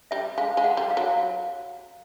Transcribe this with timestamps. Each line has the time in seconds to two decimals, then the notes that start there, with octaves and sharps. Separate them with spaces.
0.11 G3 E5
0.38 G#3 F5
0.57 G#3
0.64 F#5
0.77 G3
0.91 F5
0.97 F#3